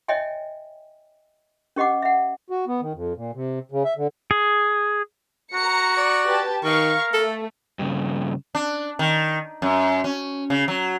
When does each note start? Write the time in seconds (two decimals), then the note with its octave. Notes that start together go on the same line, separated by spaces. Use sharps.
0.08 C#5 D#5 E5 G5 G#5
1.76 C#4 G4 D#5 F#5 D6
2.02 E5 F#5
2.50 F#4
2.67 B3
2.81 D#3
2.94 F2
3.16 A#2
3.34 C3
3.72 C#3
3.85 E5
3.97 D3
4.31 G#4
5.54 F#4 A#5 A#6 C#7
5.97 D5
6.27 G4 B4 A5
6.64 D#3 A#4 F5 C#6
7.13 A3 A4
7.79 G2 C#3
8.55 D4
8.99 D#3
9.62 F#2
10.04 C#4
10.50 C#3
10.68 F#3